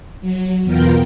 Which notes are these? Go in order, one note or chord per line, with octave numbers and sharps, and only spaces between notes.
F#3
E2 B2 B3 F4 A#4 G5